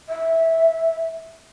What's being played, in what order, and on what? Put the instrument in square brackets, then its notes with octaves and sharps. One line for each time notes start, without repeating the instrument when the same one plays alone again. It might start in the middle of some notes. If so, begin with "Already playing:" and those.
[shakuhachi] E5